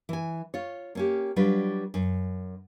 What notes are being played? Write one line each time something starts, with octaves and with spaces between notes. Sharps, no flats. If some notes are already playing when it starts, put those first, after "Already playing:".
E3 G#5
F4 C#5
A#3 C#4 G4
F#3 G3 D4 F4 B4
F#2